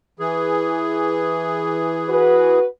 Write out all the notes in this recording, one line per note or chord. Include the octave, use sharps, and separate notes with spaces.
E3 G#4
F#4 B4